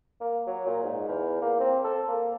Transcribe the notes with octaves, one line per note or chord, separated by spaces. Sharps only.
A#3
F#3
A#2
G#2
E2
A#3
C4
A4
A#3